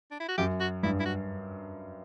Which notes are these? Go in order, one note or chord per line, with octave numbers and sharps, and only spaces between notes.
D4
E4
F#4
F#2 G4
F#4
G2 E4
E4
F#4